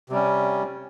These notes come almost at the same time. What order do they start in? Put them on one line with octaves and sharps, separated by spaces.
C3 G3 C#4